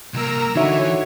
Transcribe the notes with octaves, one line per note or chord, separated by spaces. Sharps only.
C2 A#3 A#4 A#5 E6
D3 E3 D#4 F#4 C#5 E5